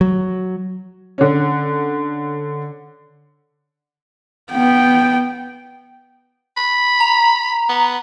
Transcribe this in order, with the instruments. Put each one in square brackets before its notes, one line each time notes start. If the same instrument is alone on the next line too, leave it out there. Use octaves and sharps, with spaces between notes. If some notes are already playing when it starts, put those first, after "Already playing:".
[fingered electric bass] F#3
[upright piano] D3 C#4
[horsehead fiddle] B3 G5
[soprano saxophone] B5
[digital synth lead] A#5
[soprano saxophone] B3